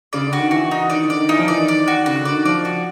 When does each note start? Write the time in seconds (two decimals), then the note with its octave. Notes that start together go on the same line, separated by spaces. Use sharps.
0.13 C#3 D5
0.26 D3
0.33 F#4
0.39 D#3
0.51 E3 F#4
0.71 D#4
0.90 D#3 D5
1.03 D3
1.10 D5
1.16 D#3
1.29 E3 D#4
1.39 F3
1.48 E3 D5
1.58 D#3
1.68 D5
1.88 F#4
2.06 C#3 F#4
2.19 D3
2.25 D5
2.32 D#3
2.45 F3 D5
2.65 F#4